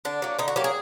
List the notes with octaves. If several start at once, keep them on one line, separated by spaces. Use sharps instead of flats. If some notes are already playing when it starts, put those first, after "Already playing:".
D3 D4
F#3 A#3
D3 D#4
F#4
F#3 A#3 G4
G#4